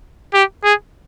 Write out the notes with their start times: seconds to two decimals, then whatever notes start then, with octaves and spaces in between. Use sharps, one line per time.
0.34 G4
0.64 G#4